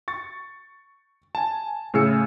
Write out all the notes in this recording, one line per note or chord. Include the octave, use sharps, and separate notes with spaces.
C#6 A6
G#5 A5
A2 C#3 G#4 E6 C#7